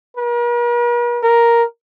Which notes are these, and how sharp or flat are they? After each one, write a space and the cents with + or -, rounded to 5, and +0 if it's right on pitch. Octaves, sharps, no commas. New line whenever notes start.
A#4 +45
A#4 +5